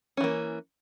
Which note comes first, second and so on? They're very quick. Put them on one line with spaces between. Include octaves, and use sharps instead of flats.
C#4 E3 A#3